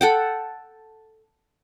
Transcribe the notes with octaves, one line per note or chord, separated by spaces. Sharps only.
A4 F#5 G5